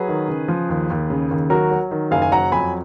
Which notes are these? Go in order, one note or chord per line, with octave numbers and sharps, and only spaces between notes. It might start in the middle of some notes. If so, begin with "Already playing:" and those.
Already playing: F#3 G#4 B4
D#3
C#3
F3
D#2
D#2
C#3
D#2
F#3 F#4 A#4
F#3
D#3
F#1 F5 G#5
G#5
F#3 F#5 A#5
F2 G#5 B5